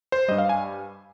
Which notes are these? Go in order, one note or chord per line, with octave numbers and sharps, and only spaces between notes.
C5
G2 G3 D#5
F5
G#5